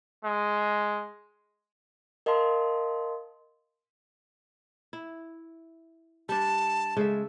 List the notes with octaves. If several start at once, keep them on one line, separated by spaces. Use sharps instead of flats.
G#3
A#4 D#5 F5 A5 C6
E4
G3 D4 A5
C#3 G#3 A4 E5